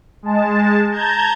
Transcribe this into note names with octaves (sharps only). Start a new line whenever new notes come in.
G#3 A5
A5 A#5 G6 G#6